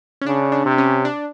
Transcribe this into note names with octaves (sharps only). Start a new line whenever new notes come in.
C#4
C#3 D4
D4
C3
C#4
D4